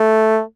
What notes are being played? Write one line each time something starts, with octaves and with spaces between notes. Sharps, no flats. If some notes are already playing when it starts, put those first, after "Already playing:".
Already playing: A3